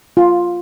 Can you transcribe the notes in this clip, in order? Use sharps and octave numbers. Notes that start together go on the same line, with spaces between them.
F4